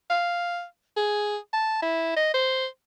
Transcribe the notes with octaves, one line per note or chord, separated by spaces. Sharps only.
F5
G#4
A5
E4
D#5
C5